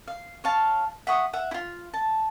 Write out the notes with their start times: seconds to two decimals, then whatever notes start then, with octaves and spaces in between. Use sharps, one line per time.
0.08 F5
0.44 C#5 F5 A5
1.07 E5 F#5 C#6 D#6
1.33 E5 F#5
1.51 E4 F4
1.94 A5